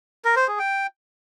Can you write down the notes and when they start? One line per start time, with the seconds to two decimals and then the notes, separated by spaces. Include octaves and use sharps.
0.25 A#4
0.36 C5
0.48 G#4
0.59 G5